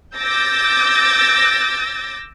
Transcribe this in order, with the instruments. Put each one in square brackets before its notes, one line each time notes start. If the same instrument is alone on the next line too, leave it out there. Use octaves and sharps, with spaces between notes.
[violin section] D6 E6 G6 A6 A#6